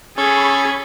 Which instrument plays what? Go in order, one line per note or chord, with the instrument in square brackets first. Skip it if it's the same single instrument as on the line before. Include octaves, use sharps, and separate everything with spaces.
[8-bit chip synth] C#4 [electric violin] G#4 [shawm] A4 [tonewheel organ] B5 C#6 G#6